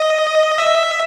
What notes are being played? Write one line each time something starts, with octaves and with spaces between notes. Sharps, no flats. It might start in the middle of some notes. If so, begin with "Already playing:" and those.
Already playing: D#5
E5